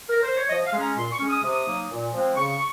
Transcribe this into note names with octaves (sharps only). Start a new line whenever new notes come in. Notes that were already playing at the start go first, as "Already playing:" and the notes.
A#4
C5
C#5
F3 D#5
F5
G#3 C#4
A#5
A#2 C6
C#6
G#3 C#4
D#6
C3
D#6
F#3 A#3 D#4
A#2
F3 G#3 C4
C#3 C#6